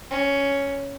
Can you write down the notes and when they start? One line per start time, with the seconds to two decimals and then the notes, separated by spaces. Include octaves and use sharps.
0.11 C#4